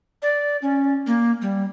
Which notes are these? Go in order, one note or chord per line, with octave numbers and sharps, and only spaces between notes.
D5
C#4
A#3
G3